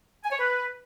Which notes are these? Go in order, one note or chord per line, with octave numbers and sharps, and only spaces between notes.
G#5
C#5
B4